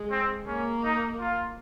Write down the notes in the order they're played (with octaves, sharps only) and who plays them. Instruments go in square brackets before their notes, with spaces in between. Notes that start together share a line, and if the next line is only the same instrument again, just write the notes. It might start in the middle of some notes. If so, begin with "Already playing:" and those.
Already playing: [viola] G#3
[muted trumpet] C4
[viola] A#3 [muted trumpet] C#4
[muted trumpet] D#4
F4